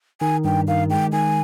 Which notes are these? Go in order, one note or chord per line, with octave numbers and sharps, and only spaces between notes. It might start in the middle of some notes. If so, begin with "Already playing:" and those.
D#3 G#5
G2 G5
D#3 F5
G#3 G5
D#3 G#5